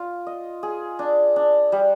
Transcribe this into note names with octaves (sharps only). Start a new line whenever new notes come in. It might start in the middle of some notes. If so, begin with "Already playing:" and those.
Already playing: F4
D#5
G#4
D4
D4
G3